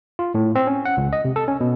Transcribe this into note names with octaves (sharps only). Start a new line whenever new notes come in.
F4
A2
C4
C#4
F#5
C#2
D#5
C3
A4
C#4
B2